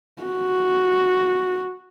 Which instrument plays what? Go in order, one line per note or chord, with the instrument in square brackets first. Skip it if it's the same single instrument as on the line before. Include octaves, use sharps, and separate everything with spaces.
[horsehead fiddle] F#4